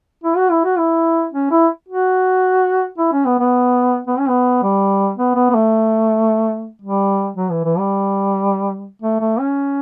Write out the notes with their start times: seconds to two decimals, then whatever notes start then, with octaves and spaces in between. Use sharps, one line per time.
0.24 E4
0.36 F#4
0.51 E4
0.65 F#4
0.78 E4
1.33 C#4
1.51 E4
1.89 F#4
2.98 E4
3.12 C#4
3.25 B3
3.39 B3
4.07 B3
4.19 C#4
4.29 B3
4.63 G3
5.18 B3
5.35 B3
5.50 B3
5.55 A3
6.82 G3
7.37 F#3
7.51 E3
7.65 E3
7.78 G3
9.02 A3
9.21 A3
9.39 C#4